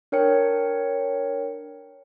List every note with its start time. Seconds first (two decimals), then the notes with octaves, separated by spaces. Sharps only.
0.12 D4 A#4 C#5 G5 C#7